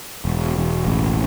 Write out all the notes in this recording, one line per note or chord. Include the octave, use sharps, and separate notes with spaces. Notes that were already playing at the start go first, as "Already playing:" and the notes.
E1
E1
A1